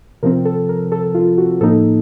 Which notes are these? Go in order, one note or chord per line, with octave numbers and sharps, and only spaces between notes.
C3 F3 C4 A#4
A4
A#4
A4
F4
F#4
A2 F3 A#3 D#4 A4